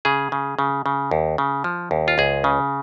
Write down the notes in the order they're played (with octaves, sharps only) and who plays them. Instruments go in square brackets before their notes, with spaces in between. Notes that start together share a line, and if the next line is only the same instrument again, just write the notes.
[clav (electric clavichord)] C#3 G#4
C#3
C#3
C#3
D#2
C#3
F3
D#2
F4
C#2 G#4
C#3